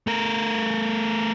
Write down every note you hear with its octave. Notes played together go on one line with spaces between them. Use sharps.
A3 A#4